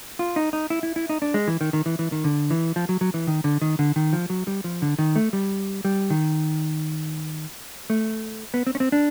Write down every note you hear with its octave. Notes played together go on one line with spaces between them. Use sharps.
F4
D#4
D#4
E4
E4
E4
D#4
D4
G#3
E3
D#3
D#3
E3
E3
D#3
D3
E3
F3
F#3
F#3
E3
D#3
D3
D#3
D3
D#3
F3
F#3
G3
F3
D3
D#3
A3
G3
G3
D#3
A3
B3
C4
C#4
C4
D4